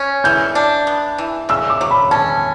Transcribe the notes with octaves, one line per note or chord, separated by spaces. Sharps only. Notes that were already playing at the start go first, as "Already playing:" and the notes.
Already playing: C#4
E3 G6
D4
B3
E3
C#3 E6
D6
F#3
B5
C#4 A5